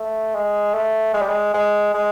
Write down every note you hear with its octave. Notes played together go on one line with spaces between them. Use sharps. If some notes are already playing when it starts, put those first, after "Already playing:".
Already playing: A3
G#3
A3
G#3
G3
G#3
G#3
G#3